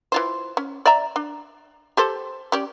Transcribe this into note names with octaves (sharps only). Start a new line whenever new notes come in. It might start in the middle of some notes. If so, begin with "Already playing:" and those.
E3 F4 C5
C#4
D5 E5 A#5
D4
G4 A4 C5
C#4 G4 D5